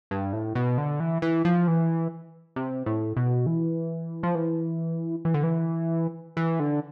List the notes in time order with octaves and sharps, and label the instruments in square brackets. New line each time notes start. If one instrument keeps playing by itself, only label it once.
[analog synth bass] G2
A2
B2
D3
E3
E3
F3
E3
C3
A2
B2
E3
F3
E3
E3
D3
E3
E3
D3